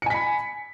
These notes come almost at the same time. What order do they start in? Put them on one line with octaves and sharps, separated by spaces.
C#7 G#5 B6 B5